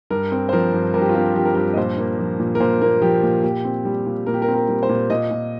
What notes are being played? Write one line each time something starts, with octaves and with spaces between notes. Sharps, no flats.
G2 A#4
C4
C5
F3 A#4
G2
G2 A#4
G4
F4
C4 G4
F3 G4
A#4
G2 G4
D#5
A#2 C5
A#3
F3
A#2
A#4
A#2 C5
A#3 A#4
F3 G4
A#2
A#2 G4
C4
G3
A#2
A#2 A#4
G4
A#4
C4
A#4
G3
C5
A#2
A#2 D#5
A#2